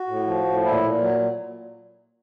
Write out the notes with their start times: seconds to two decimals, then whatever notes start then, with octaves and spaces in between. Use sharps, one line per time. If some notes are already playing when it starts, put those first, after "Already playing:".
Already playing: F#4
0.08 A2
0.26 F3
0.45 A2
0.64 A#2 E4
0.83 A#2
1.02 F#3